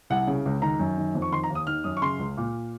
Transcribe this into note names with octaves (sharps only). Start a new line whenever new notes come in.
C2 F#5
C#3
C#2
D#3 A#5
F#2
D#3
F2
C#6
D#3 C6
A#5
D#2
D#6
D#3 F6
F#2 D#6
C#6
C#3 C6
C#2
A#2